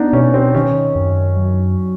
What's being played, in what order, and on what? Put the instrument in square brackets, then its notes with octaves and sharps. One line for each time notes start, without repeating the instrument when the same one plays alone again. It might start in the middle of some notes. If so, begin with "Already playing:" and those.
Already playing: [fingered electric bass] B3 [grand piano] D4 D#4
[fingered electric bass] B2 [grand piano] C#4
[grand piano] C4
[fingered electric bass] D#3 [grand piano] C#4
[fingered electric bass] F#2
F#3